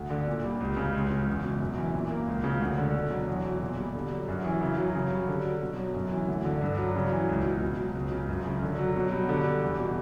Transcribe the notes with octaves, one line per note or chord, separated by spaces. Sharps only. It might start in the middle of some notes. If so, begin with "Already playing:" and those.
Already playing: D2
D3
A#2
G3
C#2
C#3
C#2
C#3
E2
B2
F#2
E3
A#2
A#3
C#2
C#3
D2
D3
B2
F#3
E2
B2
A#2
G3
D3
F#3
F#2
E3
C#3
F#3
C#3
G3
D3
F#3
B2
F#3
F#2
E3
D2
D3
G2
F#3
C#3
E3
C#2
B2
C#3
F#3
C#2
C#3
F#2
C#3
D3
F#3
B2
G3
D3
G3
E2
B2